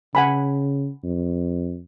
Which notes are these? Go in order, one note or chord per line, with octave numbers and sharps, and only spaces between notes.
C#3 F#5 G#5 B5
F2